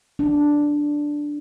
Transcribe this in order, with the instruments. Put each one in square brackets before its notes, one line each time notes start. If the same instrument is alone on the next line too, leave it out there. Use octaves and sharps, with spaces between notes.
[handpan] D4